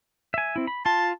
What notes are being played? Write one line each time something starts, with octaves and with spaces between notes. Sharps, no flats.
E5 G#5
C4 E4
B5
F4 A5 C6